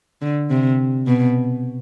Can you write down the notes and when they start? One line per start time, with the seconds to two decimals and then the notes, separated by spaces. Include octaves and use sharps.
0.22 D3
0.50 C3
1.07 B2